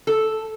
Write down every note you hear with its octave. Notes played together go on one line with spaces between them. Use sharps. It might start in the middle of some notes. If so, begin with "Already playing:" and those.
A4